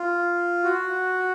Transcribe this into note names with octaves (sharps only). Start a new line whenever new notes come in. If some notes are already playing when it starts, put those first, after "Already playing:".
Already playing: F4
F#4